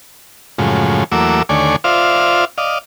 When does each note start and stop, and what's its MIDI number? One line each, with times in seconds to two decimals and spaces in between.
0.58 1.04 42
0.58 1.04 45
0.58 1.04 49
0.58 1.04 53
0.58 1.04 56
1.12 1.42 40
1.12 1.42 54
1.12 1.42 57
1.12 1.42 58
1.12 1.42 86
1.12 1.42 88
1.49 1.76 39
1.49 1.76 50
1.49 1.76 57
1.49 1.76 73
1.49 1.76 74
1.49 1.76 80
1.84 2.45 65
1.84 2.45 72
1.84 2.45 74
1.84 2.45 76
1.84 2.45 77
2.58 2.78 74
2.58 2.78 75
2.58 2.78 77